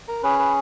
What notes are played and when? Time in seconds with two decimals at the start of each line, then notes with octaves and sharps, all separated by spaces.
0.08 A#4
0.23 C#4 G#4 B4
0.39 B4